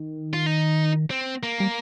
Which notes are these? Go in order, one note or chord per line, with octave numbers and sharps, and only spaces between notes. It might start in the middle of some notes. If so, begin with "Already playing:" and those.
Already playing: D#3
F4
D#4
C4
A#3
G3